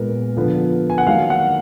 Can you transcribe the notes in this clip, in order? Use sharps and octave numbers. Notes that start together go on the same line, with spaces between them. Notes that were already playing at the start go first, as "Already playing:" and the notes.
Already playing: A#2 G#3 B3 A#4
D3 F3 B3
G#5
F#5
D#3 F#3 A#3 F5
F#5